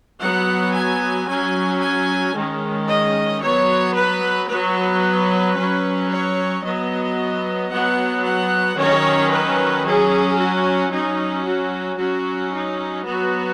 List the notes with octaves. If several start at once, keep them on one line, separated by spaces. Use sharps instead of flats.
F#3 B3 F#5
G#5
F#3 C#4 G#5
G#5
D#3 G#3 C#4
D#5
F#3 B3 C#5
B4
F#3 B3 B4
F#3 C#4
C#5
F#3 B3 D#5
F#3 B3 F#5
F#5
D#3 F#3 C#4 C#5
B4
F#3 C#4 G#4
F#4
F#3 C#4 D#4
F#4
F#3 C#4 F#4
D#4
F#3 B3 F#4